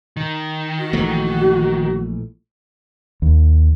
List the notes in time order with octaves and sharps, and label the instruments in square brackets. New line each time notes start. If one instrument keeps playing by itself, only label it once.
[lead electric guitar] D#3
[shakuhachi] F#4
[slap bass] A#1 E3 A3
[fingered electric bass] D#2